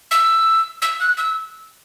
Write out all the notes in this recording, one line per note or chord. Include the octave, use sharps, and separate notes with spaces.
E6
E6
F#6
E6